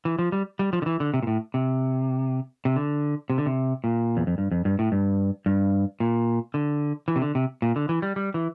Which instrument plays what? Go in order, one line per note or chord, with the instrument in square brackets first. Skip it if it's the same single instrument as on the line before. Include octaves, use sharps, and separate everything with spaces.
[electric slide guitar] E3
F3
G3
G3
F3
D3
E3
D3
C3
A#2
A2
C3
C3
D3
C3
D3
C3
A#2
E2
F2
G2
F2
G2
A2
G2
G2
A#2
D3
E3
C3
D3
C3
A#2
D3
E3
G3
G3
E3